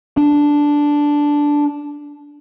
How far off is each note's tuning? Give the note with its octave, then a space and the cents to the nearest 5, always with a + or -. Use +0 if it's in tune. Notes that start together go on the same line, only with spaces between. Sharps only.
D4 -5